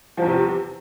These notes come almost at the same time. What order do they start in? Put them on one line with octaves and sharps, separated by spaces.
F3 E2 C3